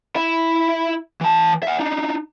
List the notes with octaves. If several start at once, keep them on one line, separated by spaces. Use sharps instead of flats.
E4 E5
E3 A5
E5 F#5
D4 D#4